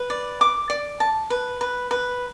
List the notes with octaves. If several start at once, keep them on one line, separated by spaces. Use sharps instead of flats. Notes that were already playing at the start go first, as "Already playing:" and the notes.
Already playing: B4
D5
D6
D5
A5
B4
B4
B4